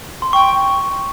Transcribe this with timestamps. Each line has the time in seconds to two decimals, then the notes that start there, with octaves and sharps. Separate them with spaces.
0.22 C6
0.33 G5 C#6